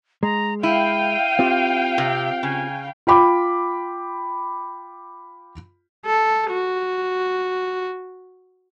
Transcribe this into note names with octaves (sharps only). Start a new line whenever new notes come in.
G#3 A#5
E4 F5 G5 D#7
C4 F4 G4
C3
C#3 G#5
F4 G5 B5 D6
A4
F#4